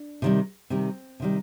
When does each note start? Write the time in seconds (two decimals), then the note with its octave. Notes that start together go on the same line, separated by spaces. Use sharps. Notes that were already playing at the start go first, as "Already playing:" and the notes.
Already playing: D4
0.22 C3 D#3 G3
0.70 C3 D#3 G3 C4
1.20 C3 D#3 G3